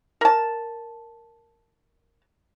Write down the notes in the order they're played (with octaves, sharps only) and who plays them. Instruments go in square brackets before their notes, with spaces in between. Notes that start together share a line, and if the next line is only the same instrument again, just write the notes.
[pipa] A#4 A5